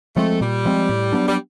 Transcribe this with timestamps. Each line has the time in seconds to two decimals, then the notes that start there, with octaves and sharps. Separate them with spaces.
0.16 F3 G#3 A3 C4
0.41 A#2 G3
0.65 F3 G#3 C4
0.89 A2
1.13 F#3 B3 D4
1.28 G3